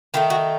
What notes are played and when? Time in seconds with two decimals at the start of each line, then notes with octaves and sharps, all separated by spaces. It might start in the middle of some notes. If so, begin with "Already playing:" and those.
0.14 D#3 A3 D#4 F4
0.30 F#4